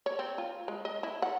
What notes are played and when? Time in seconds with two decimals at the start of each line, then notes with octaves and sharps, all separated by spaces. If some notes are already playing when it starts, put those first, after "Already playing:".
0.06 C#5
0.19 C4
0.38 F4
0.68 G#3
0.85 D#5
1.03 E4
1.22 F#5